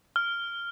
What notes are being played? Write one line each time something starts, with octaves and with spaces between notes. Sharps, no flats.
F6